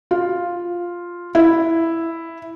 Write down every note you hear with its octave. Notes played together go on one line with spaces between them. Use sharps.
F4
E4